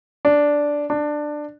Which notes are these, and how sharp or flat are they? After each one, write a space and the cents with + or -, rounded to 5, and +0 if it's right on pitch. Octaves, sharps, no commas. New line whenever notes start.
D4 -5
D4 +15